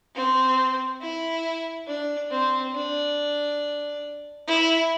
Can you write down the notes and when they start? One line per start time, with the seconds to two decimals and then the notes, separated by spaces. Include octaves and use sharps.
0.15 C4
1.02 E4
1.88 D4
2.31 C4
2.75 D4
4.48 E4